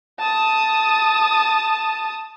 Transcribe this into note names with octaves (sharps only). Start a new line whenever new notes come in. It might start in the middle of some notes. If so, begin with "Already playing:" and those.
A5 D#6